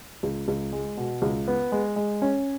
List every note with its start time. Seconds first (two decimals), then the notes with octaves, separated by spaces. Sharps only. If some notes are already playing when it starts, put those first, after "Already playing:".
0.23 C#2
0.48 C#2
0.72 G#3
0.97 B2
1.22 C#2
1.48 B3
1.72 G#3
1.96 G#3
2.22 C#4